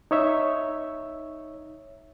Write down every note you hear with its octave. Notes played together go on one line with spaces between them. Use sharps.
D#4 C#5 E5